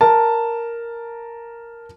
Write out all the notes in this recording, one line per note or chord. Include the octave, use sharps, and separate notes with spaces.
A#4 A5